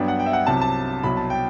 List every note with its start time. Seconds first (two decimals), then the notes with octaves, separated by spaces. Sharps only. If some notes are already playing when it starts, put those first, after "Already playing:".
Already playing: G2 F#3 B3 D4 G5
0.08 F#5
0.19 G5
0.26 E5
0.33 F#5
0.47 C2 C3 F#3 A5
0.61 A5
1.03 C2 B2 F#3 B5
1.17 A5
1.30 G5